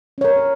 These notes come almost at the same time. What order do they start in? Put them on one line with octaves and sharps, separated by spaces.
C#4 C#5 A#4